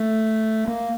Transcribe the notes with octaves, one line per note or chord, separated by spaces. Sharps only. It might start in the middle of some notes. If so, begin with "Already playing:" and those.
Already playing: A3
A#3